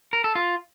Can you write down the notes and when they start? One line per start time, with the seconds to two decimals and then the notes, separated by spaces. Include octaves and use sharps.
0.13 A#4
0.24 A4
0.35 F4